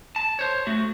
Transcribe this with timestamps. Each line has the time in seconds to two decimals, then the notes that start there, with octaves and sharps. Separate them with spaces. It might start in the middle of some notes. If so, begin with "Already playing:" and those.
0.16 A5
0.39 C5 C#5
0.67 A3 F#4